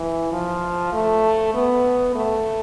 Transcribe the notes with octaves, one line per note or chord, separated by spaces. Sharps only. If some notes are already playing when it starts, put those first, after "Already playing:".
Already playing: E3
F3
A3
B3
A3